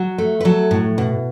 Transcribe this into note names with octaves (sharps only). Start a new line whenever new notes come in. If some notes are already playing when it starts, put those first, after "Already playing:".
Already playing: F#3
A3
B4
F#3 A4
A2
B2